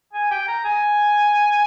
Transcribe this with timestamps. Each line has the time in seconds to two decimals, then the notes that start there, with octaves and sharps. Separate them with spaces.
0.13 G#5
0.31 G5
0.48 A#5
0.64 G#5